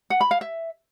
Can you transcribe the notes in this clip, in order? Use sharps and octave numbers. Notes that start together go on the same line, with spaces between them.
F#5
B5
F5
E5